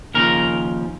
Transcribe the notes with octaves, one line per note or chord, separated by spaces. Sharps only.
D#2 C#3 F3 A#4